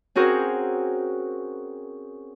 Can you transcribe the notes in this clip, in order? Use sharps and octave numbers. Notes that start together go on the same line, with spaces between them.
C4 C#4 F#4 G#4 A#4 C5